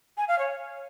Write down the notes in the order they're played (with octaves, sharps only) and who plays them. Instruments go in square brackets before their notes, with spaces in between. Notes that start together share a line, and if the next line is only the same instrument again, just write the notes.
[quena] G#5
F5
C#5